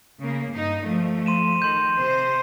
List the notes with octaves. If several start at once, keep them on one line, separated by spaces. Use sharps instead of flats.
C#3 A#3
G2 D#4
F3 A3
C6 D#7 E7
D#3 C6 G6
C3 C5